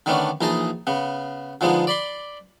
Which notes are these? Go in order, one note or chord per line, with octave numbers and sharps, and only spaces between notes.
D3 D#3 A3 B3 C#4 D4
A#1 E3 D#4 G#4 D#5 A5
C#3 B3
D3 F3 G#3 B3 D#4
D5 B5 C6